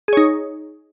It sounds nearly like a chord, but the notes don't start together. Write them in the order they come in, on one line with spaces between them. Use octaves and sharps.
G#4 C#5 D#4